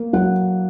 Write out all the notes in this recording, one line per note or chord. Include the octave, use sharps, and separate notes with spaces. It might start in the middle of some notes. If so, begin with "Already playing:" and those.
Already playing: A#3
F#3 F#5